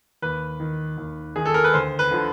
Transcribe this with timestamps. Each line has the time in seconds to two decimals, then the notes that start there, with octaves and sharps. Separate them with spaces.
0.22 D#2 B4
0.60 D#3
0.98 D#2
1.36 D#3 G#4
1.45 A4
1.54 A#4
1.64 B4
1.74 D2 C5
1.99 B4
2.11 D3 F3